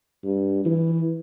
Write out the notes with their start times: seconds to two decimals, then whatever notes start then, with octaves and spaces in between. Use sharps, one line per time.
0.25 G2
0.65 E3